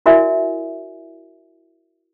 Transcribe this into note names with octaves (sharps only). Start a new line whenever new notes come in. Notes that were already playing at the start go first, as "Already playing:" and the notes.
E4 F#4 A#4 D5 E5 G#5